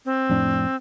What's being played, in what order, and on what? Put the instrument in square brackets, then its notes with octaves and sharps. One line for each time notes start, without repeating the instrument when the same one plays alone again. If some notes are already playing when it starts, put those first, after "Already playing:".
[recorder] C4
[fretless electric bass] F2 A2 D4